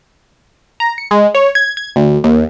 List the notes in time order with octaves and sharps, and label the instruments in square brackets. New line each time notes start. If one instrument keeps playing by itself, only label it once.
[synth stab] A#5
C#7
G#3
C#5
G#6
G#6
D2
D#2